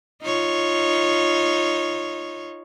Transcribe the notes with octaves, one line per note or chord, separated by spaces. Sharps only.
D#4 F4 C#5